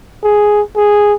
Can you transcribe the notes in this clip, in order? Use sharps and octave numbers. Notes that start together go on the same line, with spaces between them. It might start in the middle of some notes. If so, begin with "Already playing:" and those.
G#4
G#4